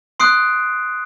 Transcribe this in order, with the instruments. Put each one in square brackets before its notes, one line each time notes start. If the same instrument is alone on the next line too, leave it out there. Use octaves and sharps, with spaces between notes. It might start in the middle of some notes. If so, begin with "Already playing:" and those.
[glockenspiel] C6 D#6 F#6 C7 D7